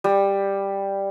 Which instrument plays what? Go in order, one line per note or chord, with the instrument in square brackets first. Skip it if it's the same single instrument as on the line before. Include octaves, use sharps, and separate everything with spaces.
[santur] G3